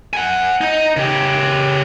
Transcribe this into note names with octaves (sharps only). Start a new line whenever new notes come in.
F#5 G#5
D#4
C#3 G4